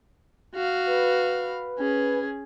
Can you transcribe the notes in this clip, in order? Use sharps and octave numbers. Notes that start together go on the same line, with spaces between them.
F#4 F5
B4
C#4 G#4